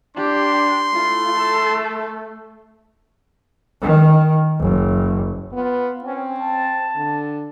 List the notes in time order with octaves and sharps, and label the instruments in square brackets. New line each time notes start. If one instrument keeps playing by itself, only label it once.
[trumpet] D4 [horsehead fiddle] G4 [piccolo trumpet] C6
[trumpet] A3 [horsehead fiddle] E4 F4
[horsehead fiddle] A4
[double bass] D#3
F#1
[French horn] B3 [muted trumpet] F4
[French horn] C4 [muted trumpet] C#4
[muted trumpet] A5
[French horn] D3